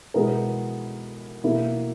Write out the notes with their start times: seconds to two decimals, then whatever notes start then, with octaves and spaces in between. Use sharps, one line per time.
0.14 B2 G#3 B3 E4 A#4
1.44 B2 A#3 E4